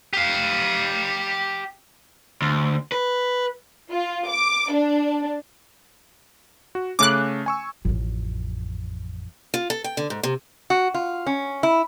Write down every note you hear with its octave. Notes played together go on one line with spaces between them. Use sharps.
G4 F5
D2
B4
F4
D6
D4
F#4
C#3 A3 C#4 D6 F#6
G#5 C#6 E6
A1 F2
F4
A4
G5
D3
G#2
C3
F#4
F4
C#4
E4